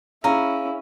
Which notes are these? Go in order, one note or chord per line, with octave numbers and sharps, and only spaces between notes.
C#4 E4 G#4 F5 A#5